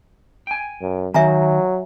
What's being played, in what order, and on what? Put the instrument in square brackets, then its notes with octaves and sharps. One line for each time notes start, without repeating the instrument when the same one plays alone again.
[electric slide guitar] G5 G#5
[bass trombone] F#2
[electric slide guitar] D#3 [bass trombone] F#3 [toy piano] E5 G#5 A#5